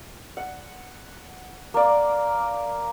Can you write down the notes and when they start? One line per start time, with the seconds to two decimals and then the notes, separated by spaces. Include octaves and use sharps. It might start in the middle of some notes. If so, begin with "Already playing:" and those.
0.37 F#5
1.74 A#3 D5